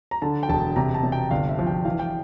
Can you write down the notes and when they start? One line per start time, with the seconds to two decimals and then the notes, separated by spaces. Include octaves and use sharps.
0.11 A#5
0.22 D3 A5
0.43 G5
0.49 E1 A5
0.76 C3 A#5
0.94 A5
1.03 C3
1.12 G5
1.31 G1 F5
1.49 E5
1.59 F3
1.67 G5
1.85 E3 F5
1.99 G5